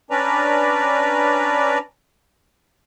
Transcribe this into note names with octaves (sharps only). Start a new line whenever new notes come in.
C#4 D4 B4 D5 A#5